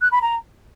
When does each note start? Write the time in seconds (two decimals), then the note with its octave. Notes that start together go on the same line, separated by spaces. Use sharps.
0.01 F#6
0.11 B5
0.22 A#5